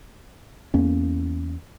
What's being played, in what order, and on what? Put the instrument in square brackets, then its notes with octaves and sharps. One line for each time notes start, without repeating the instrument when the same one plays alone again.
[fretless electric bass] E2 A#3 C#4